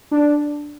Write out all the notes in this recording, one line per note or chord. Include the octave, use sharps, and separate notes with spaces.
D4